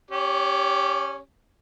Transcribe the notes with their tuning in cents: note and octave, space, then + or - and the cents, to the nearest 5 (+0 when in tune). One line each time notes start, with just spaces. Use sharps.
C#4 -10 G4 +0 C#5 +40